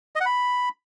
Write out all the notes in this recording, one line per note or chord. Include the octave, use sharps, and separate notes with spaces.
D#5
F#5
B5